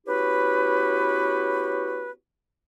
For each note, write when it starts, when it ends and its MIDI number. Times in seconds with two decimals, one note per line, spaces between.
0.07 2.11 59
0.07 2.11 61
0.07 2.11 64
0.07 2.11 66
0.07 2.11 67
0.07 2.11 71